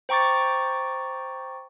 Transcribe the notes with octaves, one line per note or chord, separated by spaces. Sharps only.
C5 G5 A#5 C#6 D6 A6